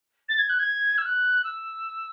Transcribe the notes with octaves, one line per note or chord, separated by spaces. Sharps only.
A6
G#6
F#6
G#6
E6
F#6
E6